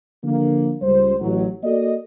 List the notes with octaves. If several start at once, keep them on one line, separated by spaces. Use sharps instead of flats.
D3 F3 A#3
C#2 G3 C5
A1 F#3
A#3 F#4 A4 D5 D#5